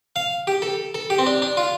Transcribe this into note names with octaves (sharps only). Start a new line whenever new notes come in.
F5
G4
A4
A4
G4
C4
D4
D4
F4